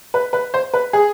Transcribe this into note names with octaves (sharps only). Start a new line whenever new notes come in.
B4
B4
C5
B4
G#4